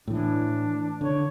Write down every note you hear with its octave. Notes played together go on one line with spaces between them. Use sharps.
A2 E3 D4
D3 C#5